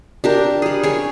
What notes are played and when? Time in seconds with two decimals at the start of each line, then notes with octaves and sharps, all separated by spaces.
0.24 D4 G4 A#4
0.62 G3 G#4
0.83 G#4 C#5